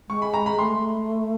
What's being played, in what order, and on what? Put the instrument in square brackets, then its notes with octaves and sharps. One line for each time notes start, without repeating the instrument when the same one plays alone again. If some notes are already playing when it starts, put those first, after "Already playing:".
[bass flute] G#3 [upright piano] C#6
[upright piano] B5
A#5
B5
[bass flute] A3 [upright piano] C6